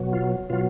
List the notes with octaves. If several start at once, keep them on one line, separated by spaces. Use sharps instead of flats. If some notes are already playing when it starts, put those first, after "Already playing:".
Already playing: B2 F#3
F4
B2 F#3 F4